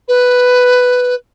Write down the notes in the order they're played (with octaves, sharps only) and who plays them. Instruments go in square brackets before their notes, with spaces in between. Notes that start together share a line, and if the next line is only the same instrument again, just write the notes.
[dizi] B4